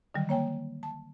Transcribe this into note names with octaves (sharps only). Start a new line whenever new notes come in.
D3 D#3 F#3 G3
A#3 C#5 G5 G#5
A5